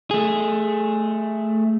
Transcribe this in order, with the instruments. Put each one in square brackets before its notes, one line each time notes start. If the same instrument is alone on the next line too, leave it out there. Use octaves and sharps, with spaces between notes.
[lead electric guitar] A3 G#4